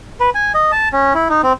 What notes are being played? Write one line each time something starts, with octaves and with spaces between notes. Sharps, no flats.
B4
G#5
D#5
A5
C#4
E4
D#4
C4